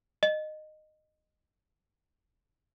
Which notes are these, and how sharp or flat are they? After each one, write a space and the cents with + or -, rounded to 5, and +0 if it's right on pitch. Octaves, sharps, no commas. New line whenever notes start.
D#5 -15